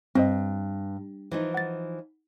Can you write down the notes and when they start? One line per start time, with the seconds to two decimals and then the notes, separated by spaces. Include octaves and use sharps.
0.15 G2 C4 C5 D#5
1.31 E3 F3 D#4
1.54 F#5 A6